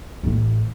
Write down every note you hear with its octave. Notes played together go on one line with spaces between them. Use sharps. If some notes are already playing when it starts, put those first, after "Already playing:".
A1